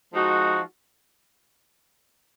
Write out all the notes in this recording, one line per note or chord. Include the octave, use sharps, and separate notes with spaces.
F3 G#3 D#4 F#4